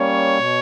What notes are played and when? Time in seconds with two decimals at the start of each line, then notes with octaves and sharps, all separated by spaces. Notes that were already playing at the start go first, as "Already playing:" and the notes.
Already playing: G3 A#3 C#4 C#5
0.37 B2